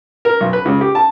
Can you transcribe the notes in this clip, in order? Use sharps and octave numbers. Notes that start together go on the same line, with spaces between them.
A#4
B1
B4
C#2
G4
A5